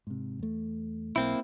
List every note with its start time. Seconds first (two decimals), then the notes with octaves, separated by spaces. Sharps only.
0.07 G#2 C3
0.39 E2 A3
1.16 B1 A#3 C4 E4